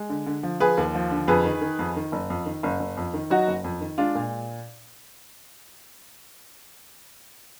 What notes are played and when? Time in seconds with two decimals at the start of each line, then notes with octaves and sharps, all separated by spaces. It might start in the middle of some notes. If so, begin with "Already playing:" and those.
Already playing: G#3
0.10 D3
0.26 D3
0.43 F3
0.60 F3 G#4 B4
0.77 D#2
0.95 F3
1.11 D3
1.28 F2 G#4 B4
1.45 D#3
1.61 D#3
1.79 F2
1.96 D#3
2.12 F#1
2.30 F2
2.46 D#3
2.63 F#1
2.80 F#1
2.97 F2
3.14 D#3
3.30 F#3 D#4 F#4
3.47 F#1
3.64 F2
3.81 D#3
3.98 G#3 D4 F4
4.15 A#2